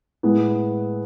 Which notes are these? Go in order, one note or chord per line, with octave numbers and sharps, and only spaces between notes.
A2 G#3 B3 E4